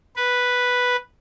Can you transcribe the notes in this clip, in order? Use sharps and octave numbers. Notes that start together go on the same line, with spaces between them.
B4